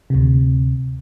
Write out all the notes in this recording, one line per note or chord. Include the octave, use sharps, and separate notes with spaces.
D2 C3